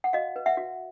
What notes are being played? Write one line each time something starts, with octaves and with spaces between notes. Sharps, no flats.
F#5
F#4 D#5 F5
B4
E5 F#5
F#4